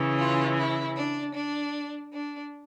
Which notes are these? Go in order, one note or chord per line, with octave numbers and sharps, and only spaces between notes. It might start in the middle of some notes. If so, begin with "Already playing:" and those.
Already playing: C#3 E3
F4
E4
D4
D4
D4